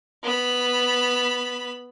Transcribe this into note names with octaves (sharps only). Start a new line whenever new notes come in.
B3 B5